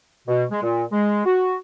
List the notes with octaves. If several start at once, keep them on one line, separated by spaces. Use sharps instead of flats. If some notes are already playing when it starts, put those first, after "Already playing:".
B2
G#3
A#2
G#3
F#4